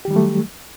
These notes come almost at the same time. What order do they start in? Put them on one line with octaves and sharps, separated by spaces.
G4 D#3 G3 F#3 A3